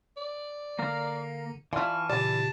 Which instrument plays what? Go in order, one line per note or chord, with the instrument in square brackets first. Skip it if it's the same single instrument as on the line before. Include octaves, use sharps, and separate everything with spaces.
[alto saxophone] D5
[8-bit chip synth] D3 [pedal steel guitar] A#3 A#4 F5
[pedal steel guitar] E3 F6 [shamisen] E4 F4 [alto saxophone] D5 [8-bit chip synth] A5 C#6
[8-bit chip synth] A#2 C#3 G4 [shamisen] D5 [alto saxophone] A5